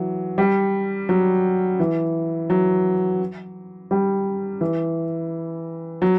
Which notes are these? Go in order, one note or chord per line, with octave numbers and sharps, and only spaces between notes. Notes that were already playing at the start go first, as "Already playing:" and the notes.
Already playing: E3 F#3
G3
F#3
E3
F#3
G3
E3
F#3